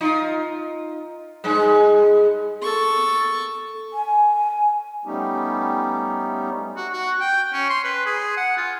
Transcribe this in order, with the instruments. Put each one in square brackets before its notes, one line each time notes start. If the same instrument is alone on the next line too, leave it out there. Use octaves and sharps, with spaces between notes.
[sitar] D#4 F4
G2 G#3
[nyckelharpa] A4 C#6
[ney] G#5
[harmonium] G3 A3 B3 C#4 D#4 G4
[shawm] F#4
F#4
G5
C#4
C6
B4
G#4
F#5
F4